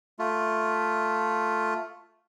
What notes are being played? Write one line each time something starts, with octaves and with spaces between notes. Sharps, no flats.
A3 F4